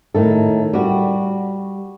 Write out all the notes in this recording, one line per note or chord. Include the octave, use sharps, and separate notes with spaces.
A2 D#3 A4
G3 F#4